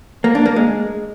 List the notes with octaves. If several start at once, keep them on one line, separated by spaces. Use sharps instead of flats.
A#3
D4
A#3
G#3